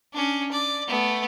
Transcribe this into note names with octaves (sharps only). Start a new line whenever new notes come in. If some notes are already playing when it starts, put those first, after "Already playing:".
C#4 D4
D5
A3 B3